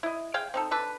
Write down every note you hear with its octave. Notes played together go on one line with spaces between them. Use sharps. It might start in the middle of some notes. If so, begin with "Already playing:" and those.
E4 D#5
G#4 F5 G5
C4 D#4 A4
D4 A4 B4